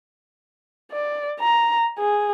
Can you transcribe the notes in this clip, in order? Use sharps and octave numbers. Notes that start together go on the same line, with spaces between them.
D5
A#5
G#4